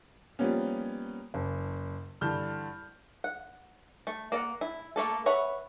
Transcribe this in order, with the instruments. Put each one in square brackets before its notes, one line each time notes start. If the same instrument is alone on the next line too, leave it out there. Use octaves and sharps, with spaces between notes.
[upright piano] F3 G3 A#3 B3 C#4
F#1
G2 D3 E3 A5 F6 G6
[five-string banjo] F#5
A3
A#3 D5 F#5
E4
A3 A#3 A4
B4 C#5 E5 F#5 B5